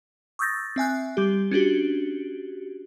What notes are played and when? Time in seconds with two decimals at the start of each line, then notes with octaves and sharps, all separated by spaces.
0.39 C#6 D#6 E6 G6 A6 A#6
0.76 C4 E5 G#5 F#6
1.17 G3 G4
1.51 C#4 D4 F#4 G4